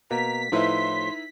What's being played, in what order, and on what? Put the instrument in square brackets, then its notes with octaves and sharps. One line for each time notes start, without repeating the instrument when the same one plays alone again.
[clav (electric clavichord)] B2 A#3 [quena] A#5 [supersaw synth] B6
[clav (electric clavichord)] A2 F3 [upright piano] D#4 E4 B4 [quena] C6